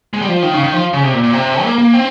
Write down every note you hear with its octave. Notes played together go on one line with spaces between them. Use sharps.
G#3
G3
F3
D#3
C#3
D#3
F3
C#3
C3
A#2
A#2
C3
A#3
A#3
C4